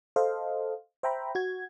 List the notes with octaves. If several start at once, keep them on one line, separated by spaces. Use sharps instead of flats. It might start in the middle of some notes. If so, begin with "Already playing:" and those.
A4 C5 D#5 F5
C5 E5 G5 A#5 B5
F#4 G#6